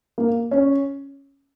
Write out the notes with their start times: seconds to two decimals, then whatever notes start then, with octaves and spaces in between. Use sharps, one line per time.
0.18 A#3
0.51 C#4